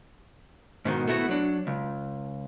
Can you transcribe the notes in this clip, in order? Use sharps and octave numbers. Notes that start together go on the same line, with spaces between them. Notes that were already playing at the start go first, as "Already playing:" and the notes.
G#2 B2 D#3
A3 B3 E4 F#4
F#3 D4
C#2